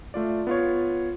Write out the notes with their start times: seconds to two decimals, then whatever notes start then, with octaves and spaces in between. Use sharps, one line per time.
0.14 A3 F4 D5
0.47 B3 F4 C#5